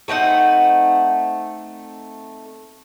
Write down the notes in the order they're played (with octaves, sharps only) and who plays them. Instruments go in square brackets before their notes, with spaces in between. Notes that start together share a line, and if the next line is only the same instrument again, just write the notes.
[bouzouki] A3 C4 D#4 F#5